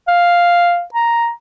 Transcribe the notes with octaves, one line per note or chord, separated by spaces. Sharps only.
F5
A#5